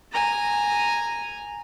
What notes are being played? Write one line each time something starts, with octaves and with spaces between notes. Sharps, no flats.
G#5 A#5